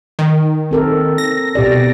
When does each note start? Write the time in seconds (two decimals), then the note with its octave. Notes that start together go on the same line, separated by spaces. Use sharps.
0.19 D#3
0.71 C4 A4 A#4
1.18 A#6
1.55 B2 G4 D5